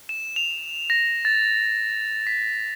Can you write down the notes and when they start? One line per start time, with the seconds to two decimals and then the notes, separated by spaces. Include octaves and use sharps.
0.09 E7
0.36 F7
0.90 A#6
1.25 A6
2.27 B6